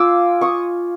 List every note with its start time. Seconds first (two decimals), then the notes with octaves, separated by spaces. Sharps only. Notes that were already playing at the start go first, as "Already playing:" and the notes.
Already playing: F4 G#5 D6 E6
0.41 C#6 D#6